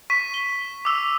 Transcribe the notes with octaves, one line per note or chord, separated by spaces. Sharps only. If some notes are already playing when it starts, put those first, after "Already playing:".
C#6 B6 D#7
G7
D6 E6 F7